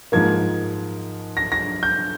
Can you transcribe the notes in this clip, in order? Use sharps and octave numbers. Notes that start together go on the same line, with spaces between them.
G#2 F3 A#3 G#6
A#6
A#6
G6